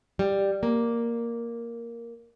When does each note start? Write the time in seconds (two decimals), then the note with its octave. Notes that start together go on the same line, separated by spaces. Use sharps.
0.19 G3
0.63 A#3